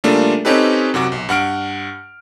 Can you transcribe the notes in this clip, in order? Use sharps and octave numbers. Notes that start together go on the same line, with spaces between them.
C#3 G3 A3 A#3 D4 F4
C4 C#4 D#4 G4 A4 B4
F#2 C3 F#4 D6
B1
G2 F#5 F6 D7